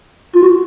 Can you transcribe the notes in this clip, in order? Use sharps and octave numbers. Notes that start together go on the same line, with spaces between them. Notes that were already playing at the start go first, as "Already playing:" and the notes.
F4
F#4